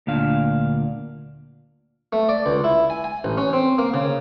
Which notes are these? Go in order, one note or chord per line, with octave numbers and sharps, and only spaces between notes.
D2 A#2 D4 F5
A3
D5
C#2
E4
G#5
G#5
A1
C#4
C4
A#3
C#3